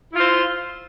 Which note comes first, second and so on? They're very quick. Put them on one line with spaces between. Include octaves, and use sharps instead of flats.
E4 F4 C5